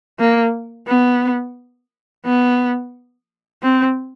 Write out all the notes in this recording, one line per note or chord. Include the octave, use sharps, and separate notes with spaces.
A#3
B3
B3
C4